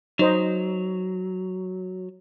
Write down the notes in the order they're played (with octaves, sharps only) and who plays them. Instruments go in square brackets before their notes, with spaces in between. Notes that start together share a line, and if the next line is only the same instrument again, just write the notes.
[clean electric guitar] F#3 [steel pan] D#4 C5 D#5